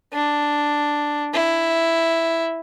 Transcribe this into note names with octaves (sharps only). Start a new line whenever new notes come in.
D4
E4